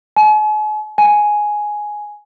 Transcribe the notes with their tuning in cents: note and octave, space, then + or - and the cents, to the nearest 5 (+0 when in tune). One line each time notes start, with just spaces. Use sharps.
G#5 +45
G#5 +5